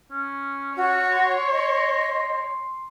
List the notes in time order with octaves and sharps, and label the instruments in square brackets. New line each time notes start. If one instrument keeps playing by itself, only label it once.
[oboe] C#4
[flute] F#4 [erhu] C#5
[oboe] C6
[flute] D#5